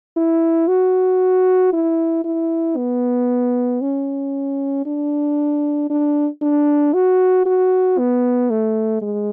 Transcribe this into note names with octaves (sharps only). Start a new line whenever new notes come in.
E4
F#4
E4
E4
B3
C#4
D4
D4
D4
F#4
F#4
B3
A3
G#3